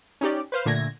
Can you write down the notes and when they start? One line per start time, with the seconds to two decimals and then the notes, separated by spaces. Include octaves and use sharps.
0.21 C#4 D#4 G4 D5
0.52 B4 C5 F5
0.66 A#2 D3 A3 G#6 A#6